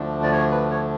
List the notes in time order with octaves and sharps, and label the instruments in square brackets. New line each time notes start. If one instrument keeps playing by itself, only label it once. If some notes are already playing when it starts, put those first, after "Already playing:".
Already playing: [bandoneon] D2 D3 F3 A3 D4
D5
C#5
B4
C#5